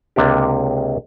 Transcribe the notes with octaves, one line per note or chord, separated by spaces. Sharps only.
C#2 C3 A#3 D4 G4